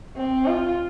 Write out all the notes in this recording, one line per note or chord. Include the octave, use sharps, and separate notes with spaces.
C4
F4